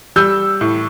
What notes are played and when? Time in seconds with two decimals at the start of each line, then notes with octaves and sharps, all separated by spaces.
0.16 G3 E6 G6
0.61 A2